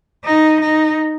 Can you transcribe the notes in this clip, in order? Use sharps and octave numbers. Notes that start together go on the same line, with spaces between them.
D#4
D#4